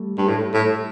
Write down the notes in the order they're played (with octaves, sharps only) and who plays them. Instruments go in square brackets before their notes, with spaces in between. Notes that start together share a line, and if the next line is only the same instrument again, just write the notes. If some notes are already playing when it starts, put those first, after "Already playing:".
Already playing: [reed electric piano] G3 A3
[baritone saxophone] G2
A2
A2